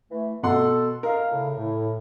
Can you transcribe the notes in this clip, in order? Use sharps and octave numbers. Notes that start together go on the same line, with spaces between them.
E3 A3
B2 A4 F#5 C6
A#4 D#5 F5
A2 C#3
A2